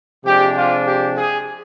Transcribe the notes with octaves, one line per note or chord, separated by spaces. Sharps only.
C3 F3 G#3 D4 G4
F4
G4
G#4